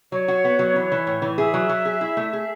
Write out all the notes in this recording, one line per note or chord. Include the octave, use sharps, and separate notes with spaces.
F#3 C#5
F#4
B3
F#3
E3
E3
A2
E3
G#4 E5
F#3
F#3
G#4
E4
A3
G#4